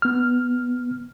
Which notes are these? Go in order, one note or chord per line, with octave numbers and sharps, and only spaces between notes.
B3 F6